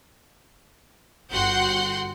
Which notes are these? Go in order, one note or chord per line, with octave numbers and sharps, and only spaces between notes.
G1 F#4 F#5 G5 C6 G6